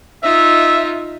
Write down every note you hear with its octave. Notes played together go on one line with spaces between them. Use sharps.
D#4 F4 E5